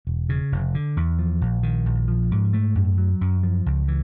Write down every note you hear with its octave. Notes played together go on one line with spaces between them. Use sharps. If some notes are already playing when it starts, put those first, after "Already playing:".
E1
C#3
F1
D3
E2
F3
A#1
D#3
A#1
F3
G#2
A3
F#2
F#3
F#2
F3
C#2
E3